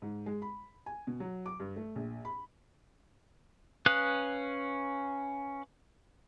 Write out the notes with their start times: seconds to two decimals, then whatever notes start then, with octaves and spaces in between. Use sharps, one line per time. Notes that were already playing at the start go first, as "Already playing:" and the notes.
0.02 G#2
0.26 G#3
0.42 B5
0.86 G#5
1.07 B2
1.20 F#3
1.46 D6
1.60 G2
1.76 A3
1.96 A#1
2.25 B5
3.86 C#4 B4 F5 D#6 F#6